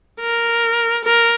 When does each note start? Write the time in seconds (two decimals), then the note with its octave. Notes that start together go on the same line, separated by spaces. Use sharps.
0.21 A#4
1.04 A#4